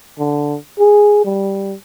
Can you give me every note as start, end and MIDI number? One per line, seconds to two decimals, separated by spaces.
0.19 0.56 50
0.80 1.24 68
1.25 1.74 55